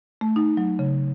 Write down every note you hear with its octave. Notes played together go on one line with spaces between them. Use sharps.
A3
D#4
F#3
C#3